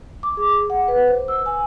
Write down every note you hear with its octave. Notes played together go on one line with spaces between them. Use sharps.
D6
G#4
F#5
B4
C5
E6
G#5